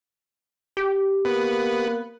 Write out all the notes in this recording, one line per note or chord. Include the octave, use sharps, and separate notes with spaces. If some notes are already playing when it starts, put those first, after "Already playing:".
G4
A#3 B3